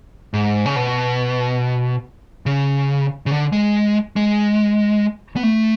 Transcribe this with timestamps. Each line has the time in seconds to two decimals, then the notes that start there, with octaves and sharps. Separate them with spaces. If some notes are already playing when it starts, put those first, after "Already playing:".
0.34 G#2
0.66 C#3
0.76 B2
2.46 C#3
3.26 C#3
3.31 D3
3.52 G#3
4.16 G#3
5.36 B3
5.43 A3